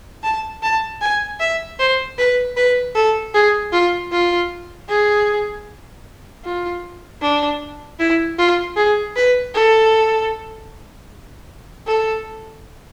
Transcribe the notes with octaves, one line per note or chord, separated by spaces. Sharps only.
A5
A5
G#5
E5
C5
B4
B4
A4
G#4
F4
F4
G#4
F4
D4
E4
F4
G#4
B4
A4
A4